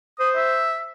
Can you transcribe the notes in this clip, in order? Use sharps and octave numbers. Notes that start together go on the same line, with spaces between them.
C5 D#6
E5